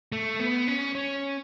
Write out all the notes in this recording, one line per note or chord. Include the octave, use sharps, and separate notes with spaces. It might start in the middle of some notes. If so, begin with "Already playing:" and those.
A3
B3
C#4
C#4